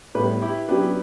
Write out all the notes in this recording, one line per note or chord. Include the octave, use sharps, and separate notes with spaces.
A2 G3 B3 G4 B4
E4 G4
F#3 B3 C#4 D4 G4 B4